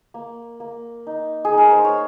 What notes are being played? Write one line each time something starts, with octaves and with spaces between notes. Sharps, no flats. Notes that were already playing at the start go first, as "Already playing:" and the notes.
A#3
A#3
D#4
G#4
D#4
A#4
C5
C#5